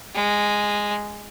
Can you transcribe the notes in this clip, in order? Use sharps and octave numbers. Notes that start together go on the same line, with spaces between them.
G#3